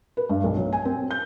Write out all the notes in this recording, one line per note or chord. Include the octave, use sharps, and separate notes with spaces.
B4
G2
B1
F#3
G#5
C4
G6